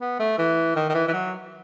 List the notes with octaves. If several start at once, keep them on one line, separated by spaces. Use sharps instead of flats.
B3
A3
E3
D#3
D#3
E3
E3
F#3